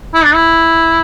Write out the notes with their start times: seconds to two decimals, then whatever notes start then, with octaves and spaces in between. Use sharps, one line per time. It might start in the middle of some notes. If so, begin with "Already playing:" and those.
0.14 E4
0.24 D4
0.34 E4